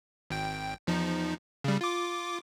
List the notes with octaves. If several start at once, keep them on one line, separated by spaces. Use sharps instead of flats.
G#1 G5
E2 F3 D#4
C#3 G3
F4 D6